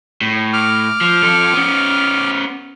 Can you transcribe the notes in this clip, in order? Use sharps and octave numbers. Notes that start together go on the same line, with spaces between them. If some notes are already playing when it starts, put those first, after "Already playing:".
A2
D6 F6
F3
F3 A4
B3 C#4